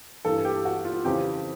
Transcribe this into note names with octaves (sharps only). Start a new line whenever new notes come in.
G2 E3 A4
G4
F#4
F4
F2 C#3 E3 G4